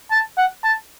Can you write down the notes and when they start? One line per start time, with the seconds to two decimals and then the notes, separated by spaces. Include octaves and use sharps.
0.11 A5
0.37 F#5
0.64 A5